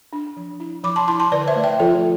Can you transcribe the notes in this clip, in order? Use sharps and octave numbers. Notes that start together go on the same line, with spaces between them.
D4
F3
E4
F3 B5 D6
A5 C6
E4 A5 C6
A5 C6
D3 B4 D5
C5 E5
A3
E5 G5
F3 F4 A4